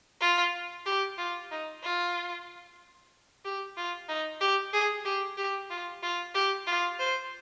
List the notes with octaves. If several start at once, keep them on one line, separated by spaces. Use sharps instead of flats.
F4
G4
F4
D#4
F4
G4
F4
D#4
G4
G#4
G4
G4
F4
F4
G4
F4
C5